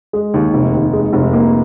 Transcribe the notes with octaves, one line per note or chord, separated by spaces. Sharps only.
G#3
D#2
F1
D#2
G#3
F1
A#3